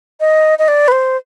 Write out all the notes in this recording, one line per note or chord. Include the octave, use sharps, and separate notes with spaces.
D#5
D#5
D5
B4
C5